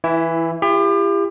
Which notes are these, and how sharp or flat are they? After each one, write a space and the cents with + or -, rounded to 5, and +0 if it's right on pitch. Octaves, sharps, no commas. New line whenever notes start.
E3 -5 E4 +15
E4 +45 G4 +35